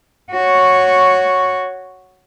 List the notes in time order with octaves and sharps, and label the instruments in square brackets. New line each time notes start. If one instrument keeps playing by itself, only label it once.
[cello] F#4 C#5